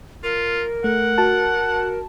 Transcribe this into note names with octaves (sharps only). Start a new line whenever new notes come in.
F4 A#4
A3 F#5
F#4 A5